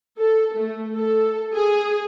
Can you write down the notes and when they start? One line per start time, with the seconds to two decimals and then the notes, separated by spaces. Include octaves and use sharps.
0.17 A4
0.54 A3
0.94 A4
1.54 G#4